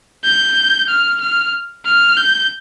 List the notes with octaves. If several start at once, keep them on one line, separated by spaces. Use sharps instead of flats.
G6
F6
F6
F6
G6